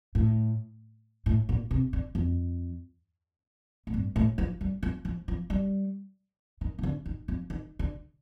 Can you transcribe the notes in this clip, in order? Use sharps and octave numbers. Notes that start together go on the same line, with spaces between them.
A2
A2
A#2
C3
D3
F2
A2
G2
A2
F3
G3
F3
F3
F3
G3
D#3
D#3
D3
D#3
F3
D#3
D3